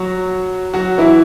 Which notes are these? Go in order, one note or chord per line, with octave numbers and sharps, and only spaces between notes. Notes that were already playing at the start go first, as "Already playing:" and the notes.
Already playing: F#3 F#4
F#3 F#4
E3 E4